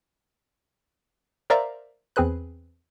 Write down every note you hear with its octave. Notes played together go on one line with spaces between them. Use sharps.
A#4 C5 D5 E5 F5 A#5
E2 C4 G#4 B4 F#6